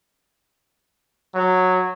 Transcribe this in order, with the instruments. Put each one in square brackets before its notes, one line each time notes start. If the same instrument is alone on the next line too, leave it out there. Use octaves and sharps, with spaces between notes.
[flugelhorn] F#3